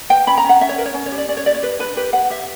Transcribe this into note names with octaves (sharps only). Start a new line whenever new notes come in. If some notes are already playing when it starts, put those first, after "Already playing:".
B4 G5
C#4 B5
A#5
C#4
F#5
C#4 E5
C#5
A#4 B4
C#5
C#4
C#5
G4
D5
C#4 D5
C#5
G4 D5
C#5
G4 B4
D4 B4
G4 B4
B4 F#5
G4 E5